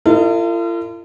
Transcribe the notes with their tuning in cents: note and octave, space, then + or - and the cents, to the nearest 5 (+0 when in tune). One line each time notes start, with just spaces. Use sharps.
F4 -45 A4 +45 D#5 +0